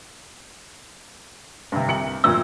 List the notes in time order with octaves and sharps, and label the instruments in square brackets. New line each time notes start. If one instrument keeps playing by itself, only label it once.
[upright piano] G2 C3
C2 C#7 F#7
[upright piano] G1 F2 A#2 [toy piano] E6